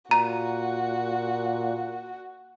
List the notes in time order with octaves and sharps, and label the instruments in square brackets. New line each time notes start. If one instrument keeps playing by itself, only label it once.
[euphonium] A#2 [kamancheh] F#4 [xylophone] A#5